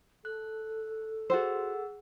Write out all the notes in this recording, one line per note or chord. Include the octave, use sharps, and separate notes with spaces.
A4 F#6
F#4 G#4 C5 F#5 E6